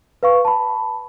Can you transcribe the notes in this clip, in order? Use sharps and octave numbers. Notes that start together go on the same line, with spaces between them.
B4 F5 C#6
A5 B5